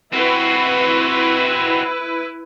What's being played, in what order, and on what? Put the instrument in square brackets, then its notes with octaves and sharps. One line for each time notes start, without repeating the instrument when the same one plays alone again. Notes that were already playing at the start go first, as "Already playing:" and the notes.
[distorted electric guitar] C4 F#4 [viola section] E4 B4